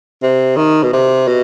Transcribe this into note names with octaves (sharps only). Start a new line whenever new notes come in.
C3
D#3
B2
C3
B2